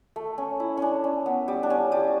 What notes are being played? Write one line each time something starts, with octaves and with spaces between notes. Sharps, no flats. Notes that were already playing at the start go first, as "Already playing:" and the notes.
A3
C#4
E4
C#4 D4
C#4
B3
G3
D4
C#4
G3